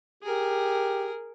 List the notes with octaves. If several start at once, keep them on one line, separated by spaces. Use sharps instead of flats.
G4 G#4 A#4